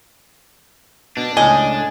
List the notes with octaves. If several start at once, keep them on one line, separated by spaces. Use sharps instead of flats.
B2 D4
C#2 A2 D#5 G#5